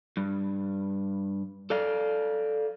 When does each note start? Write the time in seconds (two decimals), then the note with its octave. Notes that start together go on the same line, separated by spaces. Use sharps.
0.17 G2
1.70 A4 D5 F5